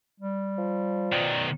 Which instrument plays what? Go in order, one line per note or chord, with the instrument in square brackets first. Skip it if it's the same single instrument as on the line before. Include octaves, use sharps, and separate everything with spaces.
[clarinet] G3
[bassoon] F3
[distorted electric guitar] B1 D#3 [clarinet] D5